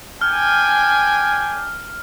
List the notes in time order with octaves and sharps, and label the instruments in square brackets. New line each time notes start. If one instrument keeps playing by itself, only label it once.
[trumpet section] D4 G5 G#5 [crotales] F6